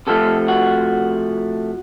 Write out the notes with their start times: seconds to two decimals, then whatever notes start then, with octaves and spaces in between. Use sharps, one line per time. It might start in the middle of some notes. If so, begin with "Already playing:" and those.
0.07 C3 F3 A3 A4
0.48 F#4